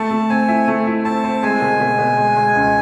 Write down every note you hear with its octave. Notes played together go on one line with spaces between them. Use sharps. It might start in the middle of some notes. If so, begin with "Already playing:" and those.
Already playing: A3 A5
A3
C4 G#5
E4
A3
E4
C4 A5
C4
G#3 G#5
B2
B2
B2
G#3
G#3
C#2